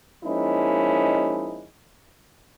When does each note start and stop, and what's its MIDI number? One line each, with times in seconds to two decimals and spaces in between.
0.24 1.66 53
0.24 1.66 56
0.24 1.66 58
0.24 1.66 61
0.24 1.66 63
0.24 1.66 64